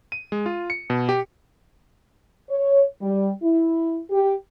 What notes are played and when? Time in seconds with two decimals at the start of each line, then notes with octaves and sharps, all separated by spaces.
0.12 D#7
0.32 G#3
0.46 F4
0.70 C#7
0.90 B2
1.09 G4
2.50 C#5
3.02 G3
3.43 E4
4.11 G4